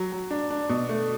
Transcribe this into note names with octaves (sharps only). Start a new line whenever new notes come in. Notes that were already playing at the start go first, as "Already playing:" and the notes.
Already playing: F#3
F#3
D4
D4
B2
A3